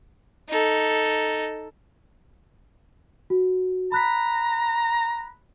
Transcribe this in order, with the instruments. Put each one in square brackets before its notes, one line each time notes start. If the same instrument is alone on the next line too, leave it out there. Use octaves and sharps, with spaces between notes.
[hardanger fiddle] D#4 A4
[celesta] F#4
[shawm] A#5 [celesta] B5 F#6 B6